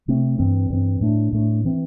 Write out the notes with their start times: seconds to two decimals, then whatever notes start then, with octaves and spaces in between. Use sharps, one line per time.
0.08 C3 A3 C4
0.39 G2 E3 C4
0.70 G2 E3 C4
1.01 A2 A3 D4
1.32 A2 A3 D4
1.65 E3 C4